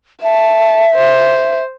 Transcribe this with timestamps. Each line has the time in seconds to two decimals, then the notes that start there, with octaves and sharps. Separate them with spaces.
0.23 E5 A5
0.94 C5